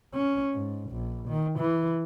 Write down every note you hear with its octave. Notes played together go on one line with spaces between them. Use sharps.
C#4
G#2
A#1
D#3
E3